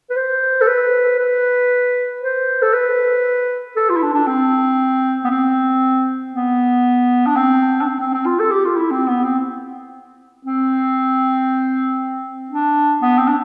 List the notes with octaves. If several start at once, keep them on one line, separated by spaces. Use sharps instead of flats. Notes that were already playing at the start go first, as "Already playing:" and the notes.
B4
C5
A4
B4
B4
C5
A4
B4
A4
F4
E4
D4
D4
C4
B3
C4
B3
D4
C4
D4
C4
C4
C4
F4
A4
G4
F4
E4
C4
B3
C4
C4
D4
B3
C4
D4